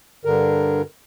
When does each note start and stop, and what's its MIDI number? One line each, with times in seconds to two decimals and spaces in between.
0.25 0.82 43
0.25 0.82 50
0.25 0.82 70